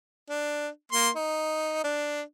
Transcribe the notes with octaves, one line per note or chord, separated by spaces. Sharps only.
D4
A#3 C6
D#4
D4